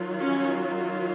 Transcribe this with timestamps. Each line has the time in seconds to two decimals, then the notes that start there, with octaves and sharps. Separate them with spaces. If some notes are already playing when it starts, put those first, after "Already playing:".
Already playing: D#3 F#3 F4
0.20 C#4 C#5